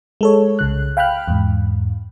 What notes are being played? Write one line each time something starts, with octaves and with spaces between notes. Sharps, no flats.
G#3 A4 C#5
C2 C#3 F#6
F5 G5 B5 F6 F#6
E2 G#2